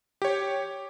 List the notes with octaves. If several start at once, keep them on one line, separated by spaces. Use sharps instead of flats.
G4 C#5